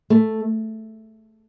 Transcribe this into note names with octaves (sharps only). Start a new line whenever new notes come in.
A3